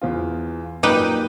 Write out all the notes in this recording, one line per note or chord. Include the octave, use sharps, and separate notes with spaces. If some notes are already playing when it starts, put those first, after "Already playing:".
E2 B3 F4
F#2 A#2 A#3 D#4 G4 B4